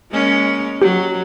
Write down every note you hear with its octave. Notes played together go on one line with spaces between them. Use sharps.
G#3 A#3 C#4
F#3 G4